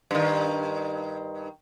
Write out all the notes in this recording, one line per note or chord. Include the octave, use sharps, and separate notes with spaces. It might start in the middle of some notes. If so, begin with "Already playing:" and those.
G2 D#3